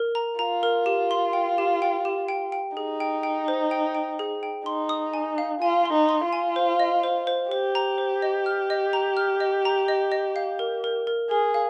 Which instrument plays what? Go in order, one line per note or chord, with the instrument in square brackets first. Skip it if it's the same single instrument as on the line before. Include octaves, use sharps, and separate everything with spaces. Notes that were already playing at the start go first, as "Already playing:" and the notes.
Already playing: [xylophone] A#4
A#5
[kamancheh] F4 [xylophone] A#5
[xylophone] A#4
G4
C6
G5
G4
G5
G4
G5
G5
[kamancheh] D#4 [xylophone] G#4
[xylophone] G5
G5
C5
G5
G5
G#4
G5
[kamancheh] D#4 [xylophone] C6
[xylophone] D#6
G#5
F5
[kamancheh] F4 [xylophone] G#5
[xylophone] C6
[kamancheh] D#4
[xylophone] C6
[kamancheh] F4
[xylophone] G#5
C5
D#5
C5
C5
[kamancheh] G4 [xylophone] C5
[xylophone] A#5
C5
D#5
F6
D#5
A#5
F6
D#5
A#5
D#5
D#5
F5
A#4
A#4
A#4
[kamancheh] G#4 [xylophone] A#4
[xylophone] F5